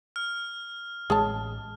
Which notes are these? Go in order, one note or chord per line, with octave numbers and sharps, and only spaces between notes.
F6
A1 G#3 G#4 C#5 A5